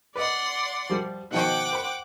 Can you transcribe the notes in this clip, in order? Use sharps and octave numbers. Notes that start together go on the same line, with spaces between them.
B4 D5 D#5 F#5 C6
F3 G3
B2 D#3 F3 F#5 G5 D6
C5 B5